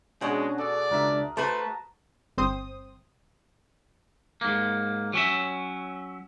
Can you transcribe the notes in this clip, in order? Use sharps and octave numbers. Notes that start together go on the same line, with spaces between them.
B2 G#3 C#4 D4 F#4 G#4 C#5 F#5
A4 D5
C#2 D4 A#4 E5
A3 F#4 B4 C5 A5 A#5
G1 C4 C5 D#6
G#2 A#3
F#3 C#4 E5